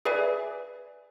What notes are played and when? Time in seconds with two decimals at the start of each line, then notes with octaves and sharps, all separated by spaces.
0.05 G#4 B4 D5 E5 G#5